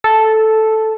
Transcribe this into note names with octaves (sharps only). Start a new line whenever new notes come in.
A4